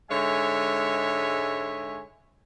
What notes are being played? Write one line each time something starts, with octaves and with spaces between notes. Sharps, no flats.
G#2 D3 G#3 C#5 E5 G#5